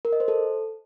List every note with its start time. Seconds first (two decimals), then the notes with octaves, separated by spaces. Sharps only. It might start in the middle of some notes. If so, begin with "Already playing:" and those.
0.05 A#4
0.12 D#5
0.20 C5
0.28 A4